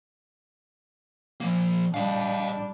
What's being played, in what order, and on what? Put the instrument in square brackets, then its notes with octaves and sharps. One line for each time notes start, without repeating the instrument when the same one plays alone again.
[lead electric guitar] F3 A#3
[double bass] G3 D4 [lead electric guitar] D#5 F5